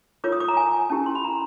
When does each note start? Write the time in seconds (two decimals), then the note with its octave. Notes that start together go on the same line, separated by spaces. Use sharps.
0.24 F4 A#4 C#5 D6
0.32 D#6
0.40 D6
0.48 A#5
0.57 G#5
0.89 C#4 E4 G4 A#4 A5
1.06 C6
1.15 B5
1.24 A#5